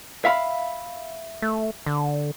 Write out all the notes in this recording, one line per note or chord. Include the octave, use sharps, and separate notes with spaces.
E5 F5 B5
A3
D3